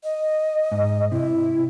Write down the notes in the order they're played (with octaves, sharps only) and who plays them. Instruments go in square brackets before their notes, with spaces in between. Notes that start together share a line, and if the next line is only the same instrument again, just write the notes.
[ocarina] D#5
[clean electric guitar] G#2
[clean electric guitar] C3 [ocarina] E4